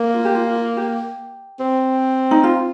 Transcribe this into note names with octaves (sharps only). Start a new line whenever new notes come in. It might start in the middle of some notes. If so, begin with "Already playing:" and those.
Already playing: A#3
F4
G4
F4
F4
G4
C4
D#4
F4